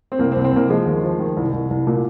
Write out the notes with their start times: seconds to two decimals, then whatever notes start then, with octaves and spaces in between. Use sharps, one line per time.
0.12 C4
0.19 C2 A#3
0.32 C4
0.36 C2
0.44 C4
0.53 C2 A#3
0.69 F3 G#3
0.86 D#2
1.03 F3
1.19 D#3
1.37 C2
1.53 C2
1.71 C2
1.87 A#2